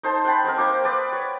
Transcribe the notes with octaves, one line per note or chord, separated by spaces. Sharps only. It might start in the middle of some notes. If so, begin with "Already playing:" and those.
D#4 C5 A5 C6
F#5 G5 A5 B5
C4 D#4 A#4
A#3 C5 D6
B4 D5 D#6
C#5